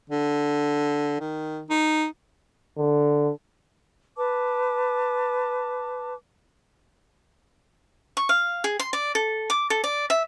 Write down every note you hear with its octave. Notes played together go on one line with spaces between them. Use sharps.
D3
D#3
D#4
D3
B4 A5 D6
C#6
F5
G#4
C6
D5
A4
D6
A4
D5
E5